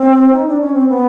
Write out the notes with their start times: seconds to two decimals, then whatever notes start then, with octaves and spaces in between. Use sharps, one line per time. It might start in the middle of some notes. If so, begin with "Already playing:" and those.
Already playing: C4
0.33 D#4
0.47 D4
0.61 C#4
0.74 C4
0.89 B3